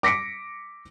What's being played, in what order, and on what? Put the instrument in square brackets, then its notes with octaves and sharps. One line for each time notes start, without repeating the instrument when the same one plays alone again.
[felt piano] D6 A#6 B6 C#7 D7